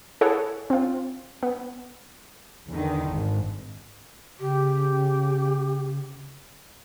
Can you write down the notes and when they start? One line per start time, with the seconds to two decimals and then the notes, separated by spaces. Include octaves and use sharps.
0.21 E4 G#4 A4 C#5 F#5
0.70 C4 F4
1.43 B3
2.69 E2 D3 D#3
3.08 G#1
4.40 C#3 G4